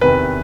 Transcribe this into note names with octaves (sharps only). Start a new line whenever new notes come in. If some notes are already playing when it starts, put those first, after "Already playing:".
E2 C3 D#3 B4